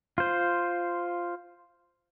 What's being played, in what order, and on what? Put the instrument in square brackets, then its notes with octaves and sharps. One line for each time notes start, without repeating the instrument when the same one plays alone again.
[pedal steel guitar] F4 C5